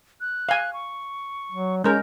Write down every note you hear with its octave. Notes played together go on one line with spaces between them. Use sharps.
F#6
F5 G#5
C#6
F#3
G#3 C#4 A#4 G6